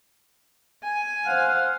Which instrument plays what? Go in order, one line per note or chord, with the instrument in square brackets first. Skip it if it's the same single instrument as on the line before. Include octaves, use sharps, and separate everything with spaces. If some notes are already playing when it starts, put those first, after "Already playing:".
[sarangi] G#5
[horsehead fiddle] C5 F5 [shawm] F#5